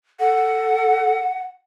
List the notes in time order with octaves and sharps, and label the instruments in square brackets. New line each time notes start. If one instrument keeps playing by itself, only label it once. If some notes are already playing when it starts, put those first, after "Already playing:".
[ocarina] A4 [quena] F#5